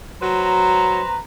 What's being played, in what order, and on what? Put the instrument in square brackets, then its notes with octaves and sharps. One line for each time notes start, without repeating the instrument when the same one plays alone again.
[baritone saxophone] F#3 [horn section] B4 C5 A#5